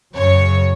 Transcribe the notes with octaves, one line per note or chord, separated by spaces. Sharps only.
F#2 C#3 F#3 C#5